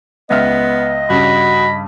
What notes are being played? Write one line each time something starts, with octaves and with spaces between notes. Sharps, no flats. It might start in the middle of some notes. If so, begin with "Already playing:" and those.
C#2 B3 D#5 E5 F6
G2 C#3 F#4 B5